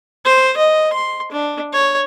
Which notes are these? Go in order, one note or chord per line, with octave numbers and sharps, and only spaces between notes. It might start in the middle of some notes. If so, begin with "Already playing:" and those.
C5
D#5
C6
D4
C#5